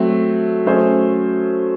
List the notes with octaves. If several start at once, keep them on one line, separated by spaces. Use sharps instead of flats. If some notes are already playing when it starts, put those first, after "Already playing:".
Already playing: F#3 A3 C4
F#3 A3 C#4 G#4 C5